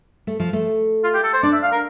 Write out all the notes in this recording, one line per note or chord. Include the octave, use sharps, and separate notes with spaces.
A3
F3
A3
F4
G4
A4
C5
D4 D5
E5
F5
A#4